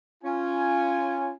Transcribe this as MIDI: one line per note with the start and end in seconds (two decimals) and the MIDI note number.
0.24 1.31 61
0.24 1.31 65
0.24 1.31 80